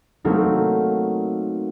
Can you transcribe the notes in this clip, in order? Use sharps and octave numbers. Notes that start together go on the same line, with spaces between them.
F#3 A3 A#3 C4 D#4